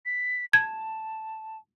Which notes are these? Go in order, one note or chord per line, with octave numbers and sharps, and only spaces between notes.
B6
A5 G#6